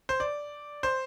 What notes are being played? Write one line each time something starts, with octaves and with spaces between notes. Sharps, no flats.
C5
D5
C5